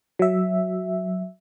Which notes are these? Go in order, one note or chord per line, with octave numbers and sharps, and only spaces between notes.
F#3 E5